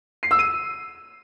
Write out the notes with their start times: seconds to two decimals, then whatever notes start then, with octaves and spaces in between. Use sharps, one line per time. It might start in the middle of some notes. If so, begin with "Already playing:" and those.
0.23 C7
0.31 E6
0.39 D#7